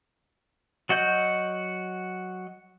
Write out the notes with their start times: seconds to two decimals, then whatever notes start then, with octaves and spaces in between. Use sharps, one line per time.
0.89 F#3 F#4 D#5 G6